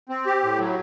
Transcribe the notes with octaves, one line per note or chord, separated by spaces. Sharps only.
C4
G4
A2
F#3